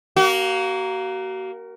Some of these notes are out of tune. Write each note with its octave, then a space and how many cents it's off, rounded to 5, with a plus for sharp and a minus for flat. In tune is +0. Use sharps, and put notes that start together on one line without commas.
A#3 +0 F#4 +40